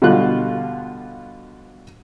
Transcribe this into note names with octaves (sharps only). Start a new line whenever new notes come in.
B2 D3 G3 F4 F#6